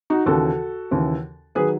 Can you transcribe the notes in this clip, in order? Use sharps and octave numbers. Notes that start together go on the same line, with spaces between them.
D#4 F#4
D#2 C#3 E3 F#4 A4
D#2 C#3 E3
D#3 F#3 G#4 B4